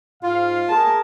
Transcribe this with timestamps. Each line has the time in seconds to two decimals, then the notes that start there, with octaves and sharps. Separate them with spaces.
0.23 G#2 F4 F5
0.69 G#4 A#4 A5